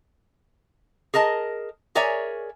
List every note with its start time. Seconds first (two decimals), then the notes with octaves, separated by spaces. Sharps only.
1.14 G#4 A#4 D#5 A5
1.95 G#4 A#4 C#5 D5 E5 G#5